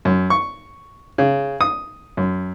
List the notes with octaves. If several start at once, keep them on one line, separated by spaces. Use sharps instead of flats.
F#2
C#6
C#3
D#6
F#2